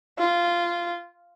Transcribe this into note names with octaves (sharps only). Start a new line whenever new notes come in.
F4